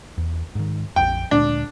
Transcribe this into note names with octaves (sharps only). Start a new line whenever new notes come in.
E2
G#2 D#3
A#1 F2 G5
D2 A#2 G#3 D4